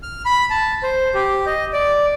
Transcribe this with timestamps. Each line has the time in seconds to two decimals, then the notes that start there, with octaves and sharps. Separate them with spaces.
0.03 F6
0.25 B5
0.50 A5
0.83 C5
1.14 G4
1.46 D#5
1.73 D5